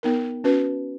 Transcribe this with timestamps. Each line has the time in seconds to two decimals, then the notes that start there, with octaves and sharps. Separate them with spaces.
0.03 B3 D#4 A#4
0.44 C#4 F#4 B4